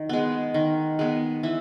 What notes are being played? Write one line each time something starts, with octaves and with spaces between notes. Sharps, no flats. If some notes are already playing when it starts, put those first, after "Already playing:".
Already playing: D#3
G#3 B3
D#3
G#3 B3
E3 E5